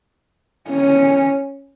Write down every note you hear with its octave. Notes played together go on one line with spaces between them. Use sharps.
C#4